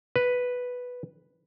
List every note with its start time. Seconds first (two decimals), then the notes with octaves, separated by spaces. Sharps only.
0.16 B4